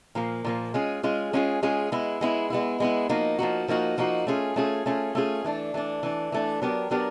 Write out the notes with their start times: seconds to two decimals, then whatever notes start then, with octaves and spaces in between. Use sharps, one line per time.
0.15 A#2 F3 A#3
0.45 A#2 F3 A#3
0.74 G#3 C#4 F4 G#4
1.03 G#3 C#4 F4 G#4
1.33 G#3 C#4 F4 G#4
1.63 G#3 C#4 F4 G#4
1.92 G#3 B3 E4
2.21 G#3 B3 E4
2.50 G#3 B3 E4
2.80 G#3 B3 E4
3.09 F3 A#3 D#4 F#4
3.39 F3 A#3 D#4 F#4
3.68 F3 A#3 D#4 F#4
3.98 F3 A#3 D#4 F#4
4.27 A3 C#4 F4 G#4
4.56 A3 C#4 F4 G#4
4.86 A3 C#4 F4 G#4
5.15 A3 C#4 F4 G#4
5.44 E3 A3 D4
5.74 E3 A3 D4
6.03 E3 A3 D4
6.32 E3 A3 D4
6.62 F#3 B3 D4 G4 A#4
6.91 F#3 B3 D4 G4 A#4